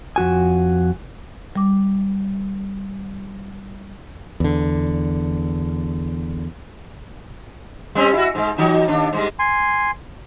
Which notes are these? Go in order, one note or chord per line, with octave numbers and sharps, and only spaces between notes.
F2 F#4 G#5
G3 D6
E2 D3
G3 C4 C#4
E4 F#4
G#2 G#3
E3 F#3 D#4
D#2 D4
G#2 G3 G#3
G#5 C6